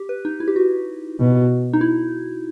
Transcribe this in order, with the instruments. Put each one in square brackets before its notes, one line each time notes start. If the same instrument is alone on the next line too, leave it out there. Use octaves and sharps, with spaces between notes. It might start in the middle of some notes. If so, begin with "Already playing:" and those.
Already playing: [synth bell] G4
B4
D#4
E4
G4
F#4
[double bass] B2
[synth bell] D#4
E4